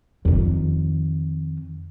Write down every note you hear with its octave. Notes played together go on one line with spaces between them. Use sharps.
F2 D#3